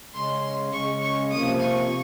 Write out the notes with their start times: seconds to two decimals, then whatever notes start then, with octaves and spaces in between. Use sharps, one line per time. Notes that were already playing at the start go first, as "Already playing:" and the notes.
0.14 C#3 G#3 C#4 C6
0.72 C#3 G#3 C#4 C#6
1.02 C#6
1.31 C3 F3 A#3 D#6
1.60 C#6